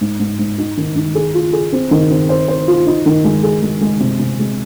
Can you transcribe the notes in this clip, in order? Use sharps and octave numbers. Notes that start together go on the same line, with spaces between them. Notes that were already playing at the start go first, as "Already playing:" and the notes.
G#2
G#2
G#2
D#4
D#3
D#3
G#4
F4
G#4
C4
D#3
C4
C5
C5
F4
D#4
D#3
G#3
G#4
G#3
G#3
C3
C3
G#3